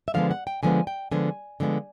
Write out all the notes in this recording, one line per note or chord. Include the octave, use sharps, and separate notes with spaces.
E5
D3 F3 G#3 B3 F5
F#5
G5
D3 F3 G#3 B3 G#5
G5
D3 F3 G#3 B3 G#5
D3 F3 G#3 B3